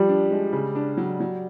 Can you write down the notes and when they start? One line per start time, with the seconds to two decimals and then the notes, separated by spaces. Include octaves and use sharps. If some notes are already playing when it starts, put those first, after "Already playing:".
Already playing: F3 G3
0.09 D4
0.31 G#3
0.53 C#3
0.75 D4
0.97 F#3
1.20 F#3